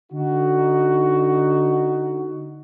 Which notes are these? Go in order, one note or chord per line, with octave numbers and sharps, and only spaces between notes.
D3 D#4 F#4